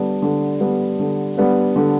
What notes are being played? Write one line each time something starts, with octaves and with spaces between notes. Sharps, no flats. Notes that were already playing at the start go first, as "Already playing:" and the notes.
Already playing: D3 G3 B3 D4
D3
G3 B3 D4
D3
G3 B3 D4
D3